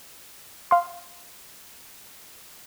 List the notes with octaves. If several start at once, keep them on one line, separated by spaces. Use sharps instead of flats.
F5 C6